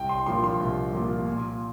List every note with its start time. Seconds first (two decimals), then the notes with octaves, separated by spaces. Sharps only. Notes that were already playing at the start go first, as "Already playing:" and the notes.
Already playing: C2 G5
0.09 C6
0.26 A#2 F3 A#3 C6
0.44 C6
0.60 C2
0.94 A#2 F3 A#3
1.26 A#2